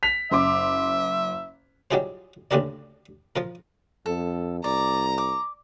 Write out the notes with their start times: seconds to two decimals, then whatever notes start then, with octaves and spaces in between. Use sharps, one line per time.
0.03 B6 F7
0.31 F#1 E5 C6 D6
1.91 F#3 G3 D#4 F4 G#4 C5
2.51 D2 C#3 D4 G4 A#4 D5
3.36 F3 F4 A#4
4.06 F2 A4
4.64 C2 D5 A#5
5.18 D6